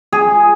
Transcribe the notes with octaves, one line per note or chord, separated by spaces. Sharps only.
G#4